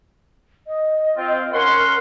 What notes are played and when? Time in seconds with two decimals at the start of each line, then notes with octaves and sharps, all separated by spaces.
0.67 D#5
1.17 C4 F4
1.53 C#4 A#4 F#5 C6